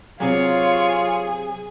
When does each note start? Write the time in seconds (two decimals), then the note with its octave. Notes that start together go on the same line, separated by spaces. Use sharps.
0.20 C3 F#3 F4 G#4 C#5